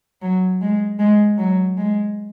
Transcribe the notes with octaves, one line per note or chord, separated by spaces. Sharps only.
F#3
G#3
G#3
F#3
G#3